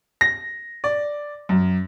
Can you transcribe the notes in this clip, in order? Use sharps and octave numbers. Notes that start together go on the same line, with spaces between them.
A#6
D5
F#2